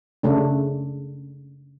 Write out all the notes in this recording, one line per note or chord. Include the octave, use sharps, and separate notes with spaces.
C#3 A3 D4